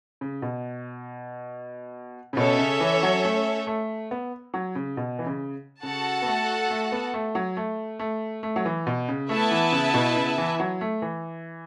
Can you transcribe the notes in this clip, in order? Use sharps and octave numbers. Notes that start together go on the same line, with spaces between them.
C#3
B2
C#3
B2 C#4 A4 C#5 E5
C#3
E3
F#3
A3
A3
B3
F#3
C#3
B2
E3
C#3
C#3 F#4 A4 F#5 A5
B3
A3
A3
B3
A3
F#3
A3
A3
A3
F#3
E3
B2
C#3
A3 B3 E4 B4 E5 A5
E3
C#3
B2
C#3
E3
F#3
A3
E3